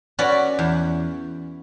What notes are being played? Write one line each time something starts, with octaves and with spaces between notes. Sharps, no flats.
C#4 F#4 B4 D5
E2